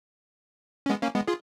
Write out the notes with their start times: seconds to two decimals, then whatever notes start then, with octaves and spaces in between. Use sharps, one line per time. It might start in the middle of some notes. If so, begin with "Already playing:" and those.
0.86 C#4
0.89 G#3 B3
1.02 A#3 C#4
1.15 G#3 B3
1.27 F4 G#4